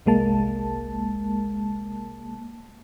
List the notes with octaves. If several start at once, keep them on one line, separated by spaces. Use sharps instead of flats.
G1 C2 G#3 A#3 A5